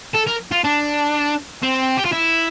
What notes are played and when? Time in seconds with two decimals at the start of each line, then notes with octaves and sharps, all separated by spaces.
0.14 A4
0.27 A#4
0.52 F4
0.64 D4
1.63 C4
1.97 G4
2.05 F4
2.12 E4